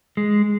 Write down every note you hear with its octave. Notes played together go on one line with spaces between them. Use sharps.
G#3